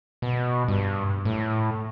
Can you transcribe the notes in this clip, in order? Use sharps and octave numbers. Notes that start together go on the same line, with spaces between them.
B2
G2
A2